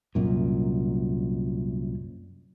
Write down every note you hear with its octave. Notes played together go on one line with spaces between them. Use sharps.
C2 F#2 A#2